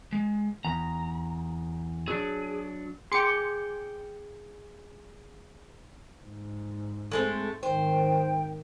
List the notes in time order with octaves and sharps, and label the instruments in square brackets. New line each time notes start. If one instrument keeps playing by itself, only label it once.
[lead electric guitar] G#3
[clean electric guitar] E2 [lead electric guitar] A#5
[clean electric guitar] F#3 D4 [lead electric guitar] G#4
[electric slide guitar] G#4 G5 [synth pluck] C6 D6 C#7
[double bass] G#2
[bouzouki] G#3 A3 C4
[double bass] G#1 D#3 [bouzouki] C5 [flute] G5